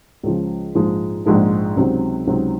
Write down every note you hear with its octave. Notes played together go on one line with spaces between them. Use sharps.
C#2 C#3 F3
A#1 G#2 F3 G#3 D#4
A#1 G#2 F3 G#3 D#4
C#2 C3 F#3 C4 D#4
C#2 C3 F#3 C4 D#4